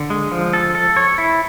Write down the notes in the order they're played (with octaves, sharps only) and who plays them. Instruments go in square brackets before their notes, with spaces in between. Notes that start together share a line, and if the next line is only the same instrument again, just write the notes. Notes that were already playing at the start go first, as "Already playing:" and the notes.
Already playing: [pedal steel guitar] D3
G#3
F3
A4
A4
C#5
E4